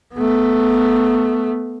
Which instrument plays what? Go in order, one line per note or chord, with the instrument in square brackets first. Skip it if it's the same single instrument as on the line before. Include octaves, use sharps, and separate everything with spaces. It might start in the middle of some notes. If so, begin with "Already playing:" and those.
[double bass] A3 B3